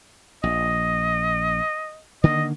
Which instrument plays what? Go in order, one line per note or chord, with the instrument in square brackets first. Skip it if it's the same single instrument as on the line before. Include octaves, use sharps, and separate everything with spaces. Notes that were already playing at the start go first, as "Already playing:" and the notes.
[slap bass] A#1 [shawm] D#5
[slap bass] D3 D#3 A#3 [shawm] D#5